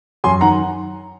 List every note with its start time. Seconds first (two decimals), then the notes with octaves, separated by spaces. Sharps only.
0.24 F#2 G#5 C6
0.41 D#3 F#5 A#5